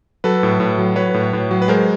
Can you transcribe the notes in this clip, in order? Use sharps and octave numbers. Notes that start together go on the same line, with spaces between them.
F#3 A4 B4
A2
A2
F#3
F#3 B4 C#5
A2
A2
F#3
B4
G#3 A#4 C5